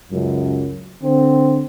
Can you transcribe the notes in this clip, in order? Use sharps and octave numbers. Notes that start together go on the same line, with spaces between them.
C#2 F#2
D3 C4